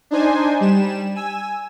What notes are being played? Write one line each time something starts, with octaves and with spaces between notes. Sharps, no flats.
D4 D#4 C5 G#5
G3 E7
G#5 E6